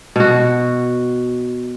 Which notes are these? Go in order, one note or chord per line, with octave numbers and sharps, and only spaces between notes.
B2 F#4